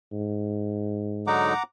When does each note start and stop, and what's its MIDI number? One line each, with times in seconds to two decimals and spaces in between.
0.12 1.53 44
1.27 1.53 50
1.27 1.53 54
1.27 1.53 63
1.27 1.63 78
1.27 1.63 82
1.27 1.63 86